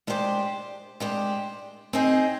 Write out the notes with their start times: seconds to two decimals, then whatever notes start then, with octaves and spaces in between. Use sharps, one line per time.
0.07 G#3 D4 G4 C5
1.00 G#3 D4 G4 C5
1.93 C4 D#4 G#4 D#5